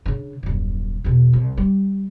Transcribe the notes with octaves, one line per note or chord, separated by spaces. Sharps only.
C#3 D4
D#1 F#2
E2 B2
C2
G3